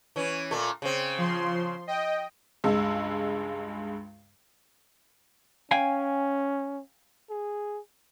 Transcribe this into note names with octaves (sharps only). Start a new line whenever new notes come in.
E3 C#4
A#2 A3
C#3 C4
F3 C6
D#5 G5
C#2 G2 G#3 E6
C#4 F5 G5 G#5
G#4